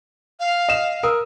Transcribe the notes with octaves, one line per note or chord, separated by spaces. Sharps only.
F5
D#5 E7
A#4 D#6 E6